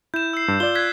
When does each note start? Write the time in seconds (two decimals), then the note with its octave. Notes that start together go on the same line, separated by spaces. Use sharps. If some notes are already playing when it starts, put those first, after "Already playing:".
0.14 E4 G6 E7
0.33 E6 C7
0.48 G2
0.60 F4 D5 G7
0.75 F#6 G#6 B6